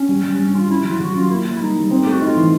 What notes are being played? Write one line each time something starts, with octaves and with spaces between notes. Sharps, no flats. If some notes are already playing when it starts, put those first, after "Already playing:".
Already playing: C#4
G3
G3
G2 C#4
G3 F4
C#4 E4
F#3 F4
F#3 F#4
C#4 F4
A#3 E4
A#3
E4
G3 D#4
G3
C4
A3 G4
F#4
D#4 F4
E3